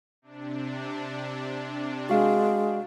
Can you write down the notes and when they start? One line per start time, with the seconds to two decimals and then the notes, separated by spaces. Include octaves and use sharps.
0.22 C3 D4
2.09 G#3 F#4 F5